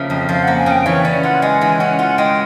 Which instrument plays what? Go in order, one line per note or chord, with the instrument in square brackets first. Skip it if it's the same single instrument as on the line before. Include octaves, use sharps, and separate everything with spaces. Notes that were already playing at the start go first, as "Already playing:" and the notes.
Already playing: [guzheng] C#3 F3 A#3 [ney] E5
[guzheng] F2
[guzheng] F3 [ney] F5
[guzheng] A#3 [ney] F#5
[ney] G#5
[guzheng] C#3 [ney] G5
[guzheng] E3 [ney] C#5
[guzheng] C#4 [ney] D5
[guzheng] F4 [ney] F#5
[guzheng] G#3 [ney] G#5
[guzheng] E3 [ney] G#5
[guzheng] C#4 [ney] F#5
[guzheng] F4 [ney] F#5
[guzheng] G#3 [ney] G5